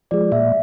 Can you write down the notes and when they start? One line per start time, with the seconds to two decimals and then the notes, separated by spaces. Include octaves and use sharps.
0.11 F3 G#3 D5
0.32 A#2 E5